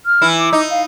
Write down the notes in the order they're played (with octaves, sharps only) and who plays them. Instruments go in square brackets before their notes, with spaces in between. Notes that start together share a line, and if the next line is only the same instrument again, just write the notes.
[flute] F6
[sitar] E3 E4
[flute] D6
[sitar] D#4
[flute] F5